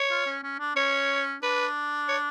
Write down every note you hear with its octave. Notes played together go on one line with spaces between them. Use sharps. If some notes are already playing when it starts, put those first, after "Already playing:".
Already playing: C#5
F4
C#4
C#4
D4
C#4 C#5
D4 B4
C#5